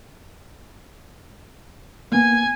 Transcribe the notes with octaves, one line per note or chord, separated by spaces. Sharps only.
A#3 B3 G#5